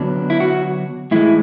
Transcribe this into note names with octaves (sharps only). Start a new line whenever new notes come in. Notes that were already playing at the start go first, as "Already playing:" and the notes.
Already playing: D3 F#3 B3 D4
E4
F#4
A2 E3 G#3 E4